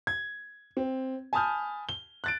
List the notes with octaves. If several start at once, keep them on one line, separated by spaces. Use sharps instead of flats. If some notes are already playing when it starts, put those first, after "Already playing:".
G#6
C4
G#5 A5 B5 D#6 F6 G6
G7
F#6 A6 D7